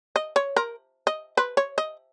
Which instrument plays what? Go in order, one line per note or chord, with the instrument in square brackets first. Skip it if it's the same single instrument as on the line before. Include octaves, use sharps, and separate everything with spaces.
[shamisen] D#5
C#5
A#4
D#5
B4
C#5
D#5